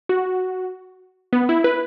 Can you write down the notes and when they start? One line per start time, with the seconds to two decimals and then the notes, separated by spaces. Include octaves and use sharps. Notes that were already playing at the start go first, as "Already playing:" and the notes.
0.09 F#4
1.33 B3
1.49 E4
1.64 B4